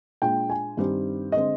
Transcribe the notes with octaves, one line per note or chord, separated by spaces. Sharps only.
A#2 G#3 D4 F4 G5
G#5
G2 D#3 G3 C4 D#4
D3 G#3 C4 D#5